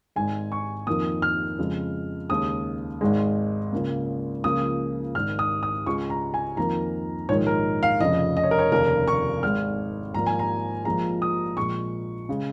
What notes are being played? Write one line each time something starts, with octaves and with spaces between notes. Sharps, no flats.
G#1 G#2 G#3 G#5
C#6
F2 D#3 A#3 D#6
F6
F2 C#3 G#3
D#2 C#3 G#3 D#6
G#1 G#2 G#3
C#2 C#3 A#3
C#2 C#3 F3 A#3 D#6
G#1 G#2 D#3 F6
D#6
D#6
C#2 C#3 G#3 C#6
A#5
G#5
F2 D#3 A#3 A#5
A#1 G#2 D#3 G#3 C#5
A#4
F5
F1 F2 C#3 D#5
D#5
C#5
A#4
C#5
F1 D#2 C#3 A#3 A#4
C#6
G#1 G#2 G#3 F6
G#1 G#2 F3 A#3 A#5
G#5
A#5
A#1 A#2 F3 G#3 A#5
D#6
A#1 A#2 G#3 C#6
C#3 G#3